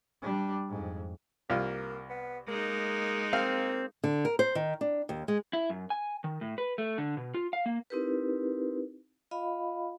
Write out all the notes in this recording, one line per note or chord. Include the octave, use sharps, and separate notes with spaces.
G3 D4
F2 G#2
C2 A#3 F4
B3
G#3 A#3 D#4
A#3 C4 F5
D3
A#4
C5
D#3
D4
D#2
G#3
E4
F#2
G#5
D#3
A2
B4
A3
D3
B2
F4
F5
A#3
C4 D#4 E4 G4 A#4 B4
F4 D#5 F5 B5